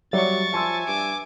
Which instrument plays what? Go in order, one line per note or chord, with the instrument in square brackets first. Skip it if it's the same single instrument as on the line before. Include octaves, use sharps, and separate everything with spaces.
[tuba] F#3 [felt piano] G3 D5 E5 [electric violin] C#6 A6
[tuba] F3 [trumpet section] E5 G#5 [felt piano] A5 C6 E6
[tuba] G2 [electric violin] D6